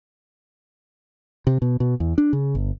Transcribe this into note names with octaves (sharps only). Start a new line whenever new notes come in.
C3
B2
B2
E2
D4
C#3
G1